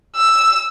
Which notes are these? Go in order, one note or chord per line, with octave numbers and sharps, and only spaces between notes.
E6